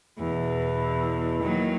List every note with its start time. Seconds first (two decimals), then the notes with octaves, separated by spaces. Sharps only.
0.19 E2 B2
1.41 D#3 F#3 A#3